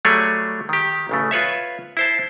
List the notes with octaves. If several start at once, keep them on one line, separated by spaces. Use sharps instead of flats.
F#3 G3 A3 G#4 C#5 D5
D#3 G4
A1 C#3 A3
F4 B4 C#5 E5
E4 C5 A5